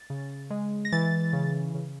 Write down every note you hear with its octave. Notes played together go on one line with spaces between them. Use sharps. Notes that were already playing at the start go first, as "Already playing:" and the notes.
Already playing: A6
C#3
G#3
A#6
E3 A6
C#3
C#3